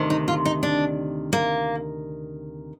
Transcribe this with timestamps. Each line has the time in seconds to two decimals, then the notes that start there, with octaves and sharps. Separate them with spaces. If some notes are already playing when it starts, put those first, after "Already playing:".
Already playing: D2 C3 D#3
0.10 D#4
0.28 F4
0.45 D#4
0.63 D4
1.33 A#3